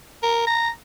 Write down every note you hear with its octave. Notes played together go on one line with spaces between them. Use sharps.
A#4
A#5